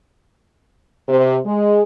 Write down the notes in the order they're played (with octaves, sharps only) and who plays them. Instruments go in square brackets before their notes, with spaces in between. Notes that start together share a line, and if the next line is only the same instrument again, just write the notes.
[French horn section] C3
G#3